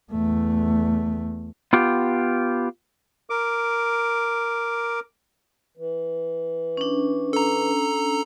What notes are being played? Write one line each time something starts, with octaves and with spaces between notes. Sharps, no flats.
E2 A3
B3 F4 G4
A#4 D6
E3
C#4 D4
A4 A#5